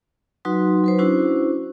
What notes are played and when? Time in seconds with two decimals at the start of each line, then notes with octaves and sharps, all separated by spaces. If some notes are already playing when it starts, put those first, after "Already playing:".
0.45 F#3 D#4 F#4 B4 C6
0.84 F#3 B4 C5
0.99 C#4 D4 E4 F#4 C5